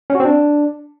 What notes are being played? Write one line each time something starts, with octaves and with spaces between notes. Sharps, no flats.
C#4
F#4
C4
D4